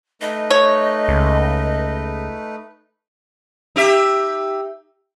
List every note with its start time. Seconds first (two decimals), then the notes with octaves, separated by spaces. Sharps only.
0.21 A3 D#4 B4 D#5
0.50 C#5
1.08 C#2
3.76 D#4 G4 E5